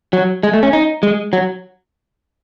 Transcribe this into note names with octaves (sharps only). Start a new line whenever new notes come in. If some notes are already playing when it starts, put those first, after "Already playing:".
F#3
G#3
A3
C#4
D#4
G#3
F#3